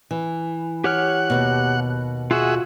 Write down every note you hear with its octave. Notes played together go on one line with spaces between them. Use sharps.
E3
G4 C#5 F#5 F6
D#2 G#2 B2
F4 F#4 G#4 E5 F#5